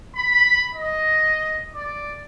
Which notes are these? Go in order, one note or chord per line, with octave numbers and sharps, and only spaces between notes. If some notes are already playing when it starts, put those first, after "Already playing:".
B5
D#5
D5